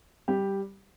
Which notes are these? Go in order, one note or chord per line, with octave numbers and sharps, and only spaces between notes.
G3 G4